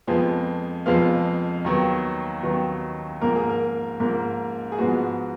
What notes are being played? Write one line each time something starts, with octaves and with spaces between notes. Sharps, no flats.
F2 F3 G#3 B3
F2 F3 G#3 B3 F5
D#2 D#3 F#3 B3
D#2 D#3 F#3 B3
G#2 F3 A#3 A#4
G#4
A#4
G#2 F3 A#3 A#4
G#4
G#2 F3 G#3 B3 F#4